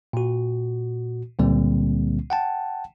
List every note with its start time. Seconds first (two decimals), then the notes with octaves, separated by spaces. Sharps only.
0.13 A#2 F#4
1.39 C#2 A#2 D3 G3 A#3 C4
2.30 F#5 G5 A5